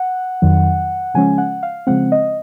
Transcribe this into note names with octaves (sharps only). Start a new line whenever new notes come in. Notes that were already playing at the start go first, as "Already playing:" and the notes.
Already playing: F#5
F2 D#3 F#3
C#3 F3 G#3 C#4 G#5
F#5
F5
C#3 F3 G#3 C4 F#5
D#5